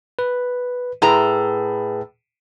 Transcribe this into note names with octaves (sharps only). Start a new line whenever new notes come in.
B4
A2 G#4 B4 A#5